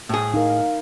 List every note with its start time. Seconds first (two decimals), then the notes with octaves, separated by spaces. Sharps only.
0.09 A2 G#4
0.34 D#4 A#4 F5